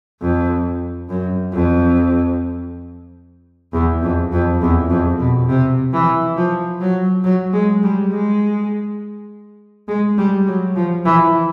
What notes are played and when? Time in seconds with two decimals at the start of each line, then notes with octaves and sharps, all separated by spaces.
0.22 F2
1.09 F#2
1.53 F2
3.73 E2
4.02 F2
4.32 F2
4.61 E2
4.90 F2
5.20 B2
5.48 C3
5.93 E3
6.36 F3
6.80 F#3
7.24 F#3
7.53 G#3
7.83 G3
8.12 G#3
9.88 G#3
10.18 G3
10.46 F#3
10.76 F3
11.05 E3